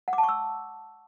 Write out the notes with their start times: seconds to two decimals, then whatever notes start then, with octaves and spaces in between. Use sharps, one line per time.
0.08 F#5
0.13 D6
0.18 A5
0.23 C#6
0.29 E6